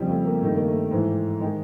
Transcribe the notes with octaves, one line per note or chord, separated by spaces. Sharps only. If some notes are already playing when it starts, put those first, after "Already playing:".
Already playing: F2 C#3 F3 G3
A3
A#3
G2 D#3 A3
A#3
A3
G#2 E3
D#3 G#3